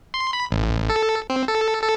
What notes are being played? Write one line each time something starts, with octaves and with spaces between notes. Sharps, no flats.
C6
B5
A1
A4
C4
A4
A4